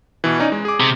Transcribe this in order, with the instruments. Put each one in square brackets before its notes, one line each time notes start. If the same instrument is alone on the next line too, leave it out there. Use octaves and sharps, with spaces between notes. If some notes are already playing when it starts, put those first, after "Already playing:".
[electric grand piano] B2 E3
C#4 D#4 D5
G#3
G#4 D6
[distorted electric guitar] C3